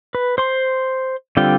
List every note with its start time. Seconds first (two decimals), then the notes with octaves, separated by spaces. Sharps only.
0.15 B4
0.38 C5 C6
1.37 D3 G3 C4 F4 G5